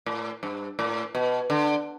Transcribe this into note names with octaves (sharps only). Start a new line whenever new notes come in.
A2
G2
A2
B2
D3